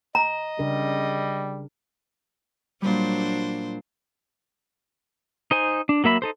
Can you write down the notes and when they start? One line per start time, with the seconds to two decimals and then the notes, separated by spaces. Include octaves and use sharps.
0.15 D#5 A#5
0.59 C#3 G3 D4 A#4
2.82 A#2 F#3 G3 D4 C5
5.51 D#4 C5 G#5
5.89 D4
6.04 F#3 A#3 E5 B5
6.22 D#4 A4 C5